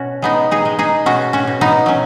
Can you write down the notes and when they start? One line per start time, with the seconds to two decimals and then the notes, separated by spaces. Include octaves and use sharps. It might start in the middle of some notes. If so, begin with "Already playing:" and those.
Already playing: B2 C#4 F#4
0.22 G#3 B3 D#4
0.51 D#4 G#4
0.65 G#3
0.79 D#4 G#4
1.06 B2 C#4 F#4
1.33 C#4 F#4
1.47 B2
1.61 B3 D#4
1.86 F#3 C#4